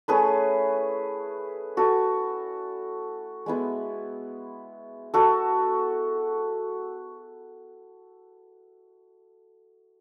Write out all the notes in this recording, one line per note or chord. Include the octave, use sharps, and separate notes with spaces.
A3 C#4 E4 G#4 B4
F#4 A4
G#3 B3 E4
F#4 A4